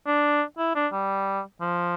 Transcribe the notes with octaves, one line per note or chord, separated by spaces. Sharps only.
D4
E4
D4
G3
F3